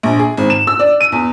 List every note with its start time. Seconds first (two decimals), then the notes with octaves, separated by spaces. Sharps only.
0.03 A#1
0.19 G#4
0.37 G#1
0.50 E7
0.67 E6
0.80 D5
1.01 D#7
1.12 E2